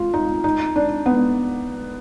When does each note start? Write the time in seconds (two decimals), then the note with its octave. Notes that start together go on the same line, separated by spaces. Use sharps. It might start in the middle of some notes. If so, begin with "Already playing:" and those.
Already playing: F4
0.14 D#4
0.44 D#4
0.76 D4
1.06 B3